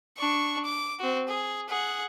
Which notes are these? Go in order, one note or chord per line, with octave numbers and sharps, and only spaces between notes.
D4 C#6
D6
C4 F#4
G#4
G#4 F#5